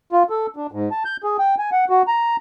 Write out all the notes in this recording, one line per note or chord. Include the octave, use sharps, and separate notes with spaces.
F4
A4
D4
G#2
A5
G6
G#4
G5
G#5
F#5
F#4
A#5